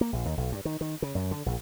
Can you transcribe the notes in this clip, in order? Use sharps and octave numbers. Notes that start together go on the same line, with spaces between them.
A#3
A#1
D#2
B1
G2
D#3
D#3
C#3
F#2
D3
A#1